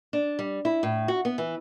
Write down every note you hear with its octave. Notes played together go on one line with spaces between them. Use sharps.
D4
G3
E4
A2
F#4
B3
E3